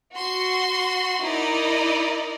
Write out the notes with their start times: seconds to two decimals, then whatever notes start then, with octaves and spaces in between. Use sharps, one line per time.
0.13 F#4 C6
1.21 D#4 E4 A#4 D5 D#5